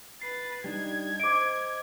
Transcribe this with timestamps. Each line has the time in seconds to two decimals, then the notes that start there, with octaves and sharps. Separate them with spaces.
0.22 B4 A6 C7
0.64 G3 D4 D#4 G#6
1.20 C5 D#5 D6 D7